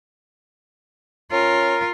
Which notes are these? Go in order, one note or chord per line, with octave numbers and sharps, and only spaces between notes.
C#4 F4 A#4